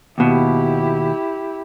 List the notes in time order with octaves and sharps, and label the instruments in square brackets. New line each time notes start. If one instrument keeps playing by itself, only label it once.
[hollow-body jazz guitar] D#2 B2 [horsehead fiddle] E4 G4